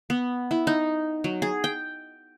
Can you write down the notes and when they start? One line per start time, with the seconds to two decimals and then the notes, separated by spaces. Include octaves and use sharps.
0.10 B3
0.51 E4
0.67 D#4
1.24 F#3
1.42 G#4
1.64 G5